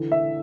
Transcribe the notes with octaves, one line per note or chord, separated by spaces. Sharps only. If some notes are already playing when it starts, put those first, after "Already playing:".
Already playing: D3 E3
E5